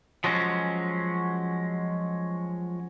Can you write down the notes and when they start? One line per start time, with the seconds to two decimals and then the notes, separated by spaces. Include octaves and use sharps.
0.24 F3 F#3 G#3 C#4